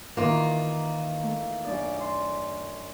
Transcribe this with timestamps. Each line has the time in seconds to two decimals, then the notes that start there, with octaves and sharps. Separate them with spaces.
0.17 D#3 E3 A#3 F4
1.23 A3
1.65 F#2 D4 D5
1.98 D5 C6